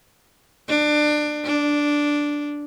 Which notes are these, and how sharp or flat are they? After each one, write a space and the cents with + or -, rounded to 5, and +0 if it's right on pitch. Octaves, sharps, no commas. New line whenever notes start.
D4 +25
D4 -5